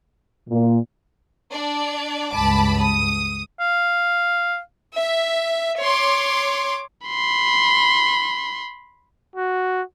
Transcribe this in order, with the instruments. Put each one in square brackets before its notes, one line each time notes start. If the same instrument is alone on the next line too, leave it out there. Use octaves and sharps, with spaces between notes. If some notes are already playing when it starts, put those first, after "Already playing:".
[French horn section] A#2
[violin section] D4 D5
[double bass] C#2 G2 [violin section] A5 B5 D6
[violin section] D#6
[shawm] F5
[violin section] E5
C#5 C6 D6
[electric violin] B5 C6
[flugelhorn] F#4